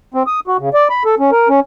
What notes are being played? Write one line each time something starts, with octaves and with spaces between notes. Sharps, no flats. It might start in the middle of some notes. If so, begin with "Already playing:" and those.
C4
D#6
F#4
C#3
D5
B5
A4
C#4
A#4
C#4